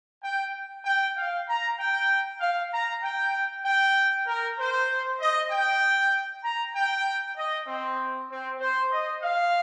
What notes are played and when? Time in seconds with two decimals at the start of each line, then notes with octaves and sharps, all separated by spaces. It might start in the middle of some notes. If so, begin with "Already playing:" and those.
0.23 G5
0.84 G5
1.16 F5
1.47 A#5
1.77 G5
2.40 F5
2.71 A#5
3.02 G5
3.64 G5
4.26 A#4
4.57 C5
5.19 D#5
5.49 G5
6.43 A#5
6.73 G5
7.36 D#5
7.67 C4
8.29 C4
8.60 C5
8.91 D#5
9.22 F5